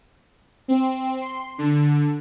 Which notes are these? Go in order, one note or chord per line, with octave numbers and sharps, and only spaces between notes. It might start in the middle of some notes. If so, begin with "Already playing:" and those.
C4
C6
D3